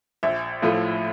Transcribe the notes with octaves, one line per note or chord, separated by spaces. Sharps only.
A#1 E5
A2 F3 A3